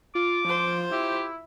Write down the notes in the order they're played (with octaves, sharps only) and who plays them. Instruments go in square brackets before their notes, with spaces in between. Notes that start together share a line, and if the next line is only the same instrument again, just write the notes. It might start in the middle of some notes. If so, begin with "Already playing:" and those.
[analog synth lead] F4 [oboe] D6
[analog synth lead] F3 [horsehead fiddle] F4 C5
[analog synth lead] E4 [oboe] G4